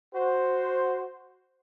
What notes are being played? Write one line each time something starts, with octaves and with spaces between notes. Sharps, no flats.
F#4 C5